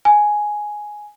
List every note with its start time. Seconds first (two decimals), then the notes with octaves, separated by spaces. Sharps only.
0.05 G#5